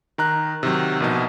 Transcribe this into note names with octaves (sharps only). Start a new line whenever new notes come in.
D#3 A#5 F#6
C3 D#3 F#3
A#1 B2 D#4